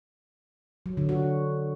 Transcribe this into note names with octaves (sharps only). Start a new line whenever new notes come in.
F#3
D3
F#4